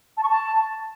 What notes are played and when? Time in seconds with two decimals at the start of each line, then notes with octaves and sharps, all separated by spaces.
0.17 A5
0.23 C#6
0.29 A5